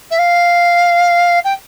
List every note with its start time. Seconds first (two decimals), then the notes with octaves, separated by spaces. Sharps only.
0.11 E5
0.19 F5
1.45 G5